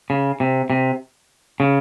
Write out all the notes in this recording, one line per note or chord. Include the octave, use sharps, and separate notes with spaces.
C#3
C3
C3
C#3